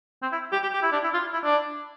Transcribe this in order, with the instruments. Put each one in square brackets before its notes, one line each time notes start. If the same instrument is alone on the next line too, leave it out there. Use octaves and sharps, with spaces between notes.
[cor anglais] C4
E4
G4
G4
G4
E4
D4
E4
F4
E4
D4